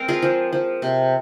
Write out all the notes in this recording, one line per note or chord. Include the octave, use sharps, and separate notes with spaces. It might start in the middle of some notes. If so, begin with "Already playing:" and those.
Already playing: G#3 C4 A#4 C5
F4 G#4
F3
F3
C3